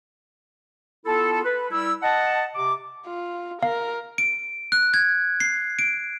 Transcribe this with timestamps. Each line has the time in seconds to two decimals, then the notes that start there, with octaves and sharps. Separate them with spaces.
1.05 B3 E4 F4 A4
1.44 B4
1.71 G3 E4 E6
2.03 D#5 F#5 A5
2.55 C3 D6
3.07 F4
3.63 A#4 F5
4.18 D7
4.72 F#6
4.94 G#6
5.40 C7
5.79 D7